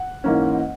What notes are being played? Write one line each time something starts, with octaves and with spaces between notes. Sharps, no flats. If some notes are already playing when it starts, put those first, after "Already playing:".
Already playing: F#5
G#2 E3 A#3 C#4